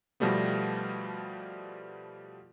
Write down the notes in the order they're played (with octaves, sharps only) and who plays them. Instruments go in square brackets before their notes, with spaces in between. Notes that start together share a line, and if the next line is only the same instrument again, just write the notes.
[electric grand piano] B2 F3 G3 A3 B3